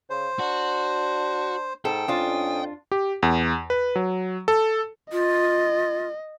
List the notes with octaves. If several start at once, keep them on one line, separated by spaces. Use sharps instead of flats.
C#3 C5
D4 F#4
G#2 A4 G5
F2 C#4 D4 F4 D#6
G4
E2
B4
F#3
A4
F4 D#5